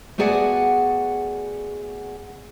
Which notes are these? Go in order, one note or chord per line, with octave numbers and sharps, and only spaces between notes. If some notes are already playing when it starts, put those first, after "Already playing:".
A3 B3 F#4 G#4 D5 F#5